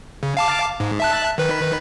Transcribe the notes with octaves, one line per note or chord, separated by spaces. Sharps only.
C#3
F5 A5 D6
G#2
E5 A5 F#6
D#3 B4